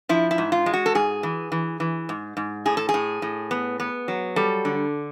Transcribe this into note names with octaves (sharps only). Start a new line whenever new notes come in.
F3 E4
E4
G#2
F4
G#3
F#4
A4
G#2 G#4
E3
E3
E3
G#2
G#2
A2 G#4
A4
G#4
A2
A2
B3
B3
F#3
G3 A4
D3